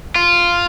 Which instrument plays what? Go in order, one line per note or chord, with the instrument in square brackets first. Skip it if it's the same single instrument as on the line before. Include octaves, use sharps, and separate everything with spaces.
[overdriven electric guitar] F4